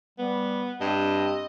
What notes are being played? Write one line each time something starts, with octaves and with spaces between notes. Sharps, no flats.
G3 B3
G2 C4 D#5